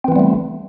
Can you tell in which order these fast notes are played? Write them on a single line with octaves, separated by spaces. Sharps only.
C4 E3 B3 G3 A3